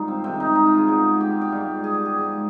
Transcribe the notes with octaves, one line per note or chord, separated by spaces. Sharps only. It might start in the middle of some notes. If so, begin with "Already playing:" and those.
Already playing: G2 D#3 G#3 D#4 F4
C4
C3 D#3 G#3 C4
D#4
D#4
F4
G#4
B2 G#3
G4
F4
G4
G#2 G3 F4
G#4
G4
G#4
G#2 F3 G#3